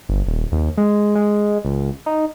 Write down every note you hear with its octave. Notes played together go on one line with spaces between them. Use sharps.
G1
D#1
D#2
G#3
G#3
C#2
D#4